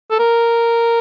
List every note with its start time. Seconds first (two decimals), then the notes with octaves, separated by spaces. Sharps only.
0.11 A4
0.19 A#4